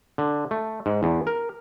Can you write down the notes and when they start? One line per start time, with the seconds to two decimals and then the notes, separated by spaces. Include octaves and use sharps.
0.18 D3
0.51 A3
0.86 G#2
1.03 E2
1.27 A#4